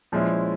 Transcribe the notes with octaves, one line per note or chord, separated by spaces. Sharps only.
A#2 F3 G#3 C#4 E4